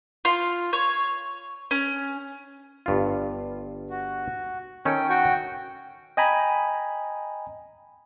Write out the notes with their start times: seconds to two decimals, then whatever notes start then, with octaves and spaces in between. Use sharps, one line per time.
0.25 F4
0.73 C#5
1.71 C#4
2.86 G1 G2 F4
3.90 F#4
4.85 D#3 C#4 A4 G5
5.09 F#4 G5 C#6
6.17 D#5 G5 G#5 A#5 B5